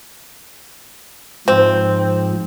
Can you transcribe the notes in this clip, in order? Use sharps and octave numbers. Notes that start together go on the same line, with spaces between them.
G#2 F3 C4